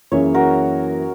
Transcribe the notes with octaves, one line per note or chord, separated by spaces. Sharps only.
F#2 E3 A#3 C#4 G#4 C#5 E5
F#4 A#4